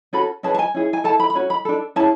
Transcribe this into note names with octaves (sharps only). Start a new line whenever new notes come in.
C#4 F#4 A4 B5
C#4 G#4 B4 A5
A5
G#5
C#4 E4 G#4
G#5
E4 A4 A5
B5
B5
C#4 F#4
B5
D4 A4
C#4 E4 G#4 A5